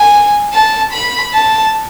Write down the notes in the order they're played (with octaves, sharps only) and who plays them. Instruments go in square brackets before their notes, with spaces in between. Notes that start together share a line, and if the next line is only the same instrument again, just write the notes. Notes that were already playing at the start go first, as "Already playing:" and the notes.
Already playing: [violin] G#5
A5
B5
A5